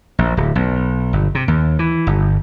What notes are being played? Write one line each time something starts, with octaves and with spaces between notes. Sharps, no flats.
A#1
D1
B1
G1
C3
D#2
E3
G1